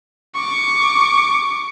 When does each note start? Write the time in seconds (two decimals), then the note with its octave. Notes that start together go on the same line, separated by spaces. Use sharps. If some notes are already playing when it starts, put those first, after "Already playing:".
0.35 C#6 D6